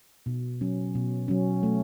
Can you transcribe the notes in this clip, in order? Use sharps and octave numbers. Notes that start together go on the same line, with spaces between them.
B2
F#3 C#4
B2
F#3 C#4
A3